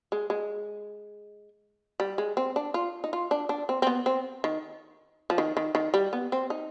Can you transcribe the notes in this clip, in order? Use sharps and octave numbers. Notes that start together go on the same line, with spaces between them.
G#3
G#3
G3
G#3
C4
D4
F4
D#4
F4
D4
D4
C4
C4
B3
C4
D#3
F3
D#3
D#3
D#3
G3
B3
C4
D#4